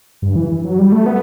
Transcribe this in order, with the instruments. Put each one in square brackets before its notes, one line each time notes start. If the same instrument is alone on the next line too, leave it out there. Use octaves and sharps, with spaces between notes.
[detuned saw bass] G2
E3
F#3
G3
A3
B3